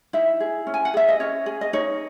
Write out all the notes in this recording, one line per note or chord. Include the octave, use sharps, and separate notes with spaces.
D#4 E4 E5
G#4
C#4
G#5
F#5
G#4 E5
D#5
C#4 C#5
G#4
D#5
D#4 C#5